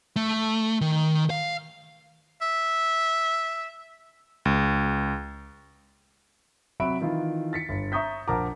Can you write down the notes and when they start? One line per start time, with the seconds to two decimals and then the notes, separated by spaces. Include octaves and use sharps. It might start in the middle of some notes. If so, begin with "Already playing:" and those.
0.16 A3
0.81 D#3
1.30 F5
2.42 E5
4.45 C#2
6.80 C3 F#3 F#4 E5 B5 D7
7.01 D#3 E3 E4 F4
7.53 A6 B6 C#7
7.69 G1
7.92 E5 A#5 C#6 D#6 G6 B6
8.28 A#1 A#4 F#5 A5 A#5 D6